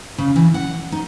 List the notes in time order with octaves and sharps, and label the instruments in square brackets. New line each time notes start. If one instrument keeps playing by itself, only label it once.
[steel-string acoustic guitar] C#3
E3
F#5
D#4